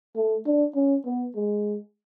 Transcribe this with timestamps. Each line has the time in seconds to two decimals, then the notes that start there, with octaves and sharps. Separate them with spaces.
0.16 A3
0.46 D4
0.75 C#4
1.05 B3
1.35 G#3